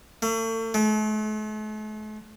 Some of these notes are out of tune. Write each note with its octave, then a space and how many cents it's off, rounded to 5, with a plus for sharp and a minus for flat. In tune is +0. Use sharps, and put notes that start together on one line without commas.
A3 +40
A3 -45